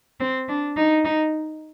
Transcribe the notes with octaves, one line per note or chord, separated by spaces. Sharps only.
C4
D4
D#4
D#4